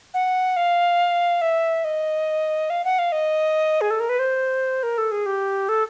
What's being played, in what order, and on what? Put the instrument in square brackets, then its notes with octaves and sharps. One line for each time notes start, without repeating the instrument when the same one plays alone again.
[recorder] F#5
F5
E5
D#5
F5
F#5
F5
D#5
G#4
A4
A#4
B4
C5
A#4
A4
G#4
G4
A4